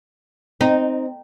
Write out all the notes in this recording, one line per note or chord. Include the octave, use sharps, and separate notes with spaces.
C4 D#4